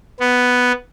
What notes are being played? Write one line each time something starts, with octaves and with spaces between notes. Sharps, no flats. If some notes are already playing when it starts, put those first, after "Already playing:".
B3